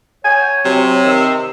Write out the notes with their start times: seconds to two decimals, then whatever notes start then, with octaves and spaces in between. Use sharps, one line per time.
0.25 C#5 G#5
0.65 C3 F#3
1.05 D#3 E6